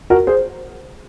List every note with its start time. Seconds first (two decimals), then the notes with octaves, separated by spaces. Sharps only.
0.10 F#4 A#4
0.27 G#4 C5